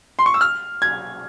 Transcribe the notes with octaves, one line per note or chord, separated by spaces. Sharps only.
C6
C#6
E6
F6
G#6